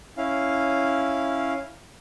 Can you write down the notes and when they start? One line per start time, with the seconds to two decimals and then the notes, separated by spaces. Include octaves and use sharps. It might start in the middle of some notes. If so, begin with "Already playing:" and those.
0.17 C#4 E4 F5